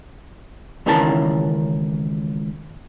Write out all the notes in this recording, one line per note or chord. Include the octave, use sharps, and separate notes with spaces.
C#2 D#3 E3 C#4 A#4 A5